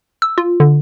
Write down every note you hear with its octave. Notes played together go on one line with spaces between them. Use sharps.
E6
F4
D3